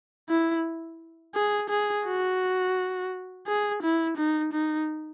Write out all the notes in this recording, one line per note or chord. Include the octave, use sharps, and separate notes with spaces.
E4
G#4
G#4
F#4
G#4
E4
D#4
D#4